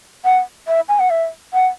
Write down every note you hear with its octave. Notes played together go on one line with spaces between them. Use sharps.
F#5
E5
G#5
F#5
E5
F#5